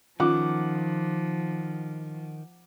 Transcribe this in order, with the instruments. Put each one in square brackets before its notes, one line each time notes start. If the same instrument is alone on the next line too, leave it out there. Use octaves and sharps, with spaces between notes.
[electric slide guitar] D#3 [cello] F3 [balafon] C#4 F4 [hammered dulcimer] F#5 D6